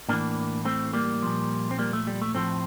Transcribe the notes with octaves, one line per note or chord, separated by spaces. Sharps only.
A2 E3 A#3 D4
A3 C4
G3 A#3
A#2 F3
C4
G3 A#3
A3
G3
A3
A2 F3 A3 C4